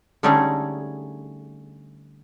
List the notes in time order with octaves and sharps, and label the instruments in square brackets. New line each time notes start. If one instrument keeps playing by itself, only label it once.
[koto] D3 G3 A3 C#4 D#4 G#4